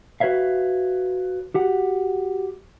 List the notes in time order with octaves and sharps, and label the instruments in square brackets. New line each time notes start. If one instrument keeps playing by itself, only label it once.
[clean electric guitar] F#4 B4 C#5 E5 F5
F#4 G4 F#5